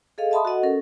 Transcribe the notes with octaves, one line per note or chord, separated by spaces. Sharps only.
G#4 A4 D#5 F5
D#5 E5 A5 B5 C6 D#6
F#4 A4 D#5 F#5
C#4 A4 A#4